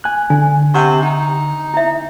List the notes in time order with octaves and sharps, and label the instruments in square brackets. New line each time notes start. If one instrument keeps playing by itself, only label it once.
[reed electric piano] G#5 F#6
[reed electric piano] D3 [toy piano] G#5
[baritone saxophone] C3 [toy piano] F#5 C#6
[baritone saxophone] D#4
[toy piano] E4 E5